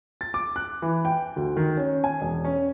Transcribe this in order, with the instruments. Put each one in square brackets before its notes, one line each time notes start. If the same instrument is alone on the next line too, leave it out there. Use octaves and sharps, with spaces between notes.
[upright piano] A6
D6
F#6
E3
G5
D2
D#3
C#4
G#5
E1
C#4